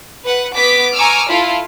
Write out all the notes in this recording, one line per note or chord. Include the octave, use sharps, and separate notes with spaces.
B4 F#5
B3 D6 B6
G#5 A#5 C#6 D6 E6 F6
E4 F4 A4 F5